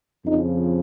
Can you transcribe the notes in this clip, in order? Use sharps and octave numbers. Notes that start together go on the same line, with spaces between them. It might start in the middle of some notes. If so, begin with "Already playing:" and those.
F2 C#3 F3 D#4